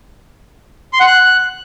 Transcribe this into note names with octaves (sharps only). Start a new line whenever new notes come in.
C6
F#5
F#6